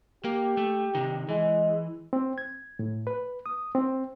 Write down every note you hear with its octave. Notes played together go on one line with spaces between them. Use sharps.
A#3 G4
A3
C3 D#3
E3 G#3
C4
G#6
A2
B4
D#6
C4